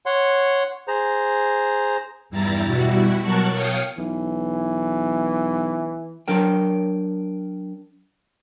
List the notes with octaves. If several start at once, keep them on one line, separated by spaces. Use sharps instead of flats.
C#5 F#5 C6
G#4 C5 A#5
E2 G2 G3 E4 A#5 A6
B2 G3 E4 F#4
B2 F#3 A#4 A5 C#6 F#6
C#5 F5 G5 C#6 D#6 F6
B1 E3
F#3 D4 A#4 G5